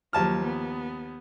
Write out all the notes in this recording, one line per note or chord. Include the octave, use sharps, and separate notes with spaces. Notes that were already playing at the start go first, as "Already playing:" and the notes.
D#2 F3 F#3 A5 F6
B3